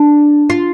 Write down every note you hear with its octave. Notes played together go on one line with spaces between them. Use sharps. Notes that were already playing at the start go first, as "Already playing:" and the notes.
Already playing: D4
F4